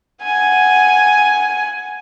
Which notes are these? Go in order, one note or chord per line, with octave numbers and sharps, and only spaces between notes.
F#5 G#5